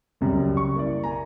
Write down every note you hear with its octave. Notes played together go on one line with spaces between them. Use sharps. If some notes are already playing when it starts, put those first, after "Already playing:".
C#2 F#2 C#3 G3
C#6
A#3 E4 D5
G#5 A#5